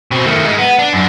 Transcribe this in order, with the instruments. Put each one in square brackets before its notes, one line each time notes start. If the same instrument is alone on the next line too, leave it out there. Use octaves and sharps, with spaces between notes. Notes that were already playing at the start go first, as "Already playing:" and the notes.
[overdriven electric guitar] B2 C4
D#3 A3
G#3 D#4
B3
D4
F#2 D4